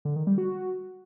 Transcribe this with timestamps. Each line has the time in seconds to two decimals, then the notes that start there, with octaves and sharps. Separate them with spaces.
0.05 D3
0.16 D#3
0.27 G3
0.38 F#4